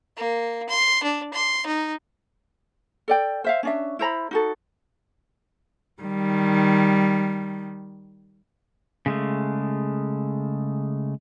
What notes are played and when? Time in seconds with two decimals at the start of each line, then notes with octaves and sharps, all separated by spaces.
0.17 A#3
0.69 C6
1.03 D4
1.33 C6
1.66 D#4
3.08 A4 D5 G5
3.44 C5 E5 F5
3.63 C#4 D4 E5
3.99 E4 C5 A#5 B5
4.31 D#4 F#4 A4
6.02 D#3 G3
9.06 C#3 G#3 A3